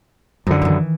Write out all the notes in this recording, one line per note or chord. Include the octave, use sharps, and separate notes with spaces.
F#2 D3 F3
D#3 E3